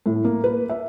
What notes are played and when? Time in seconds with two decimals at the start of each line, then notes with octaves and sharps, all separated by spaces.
0.06 A2
0.24 A#3
0.44 B4
0.69 E5